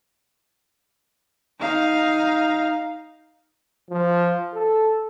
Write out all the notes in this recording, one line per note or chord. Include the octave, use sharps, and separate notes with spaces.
D#4 F5
F3
A4